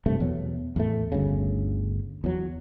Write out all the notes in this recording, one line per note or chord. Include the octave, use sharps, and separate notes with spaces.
G2 C3 A3
E2 B2 F#3
E2 A2 A3
G1 D2 C#3
E2 F#3